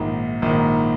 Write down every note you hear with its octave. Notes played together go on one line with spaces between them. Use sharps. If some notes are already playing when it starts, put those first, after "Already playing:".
Already playing: A#1 G#2 D#3
A#1 G#2 D#3